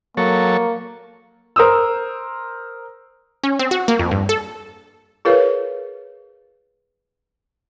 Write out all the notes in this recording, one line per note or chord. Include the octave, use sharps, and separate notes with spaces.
F#3 A#3 A4 C#5
A#4 C5 D#6 E6
C#4
C4
F#4
A#3
F2
G2
A4
F4 G#4 A#4 B4 C#5 F5